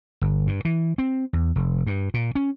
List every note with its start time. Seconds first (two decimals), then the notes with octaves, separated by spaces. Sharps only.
0.21 G1
0.47 G2
0.65 E3
0.98 C4
1.33 E2
1.56 F1
1.87 G2
2.14 A#2
2.35 C#4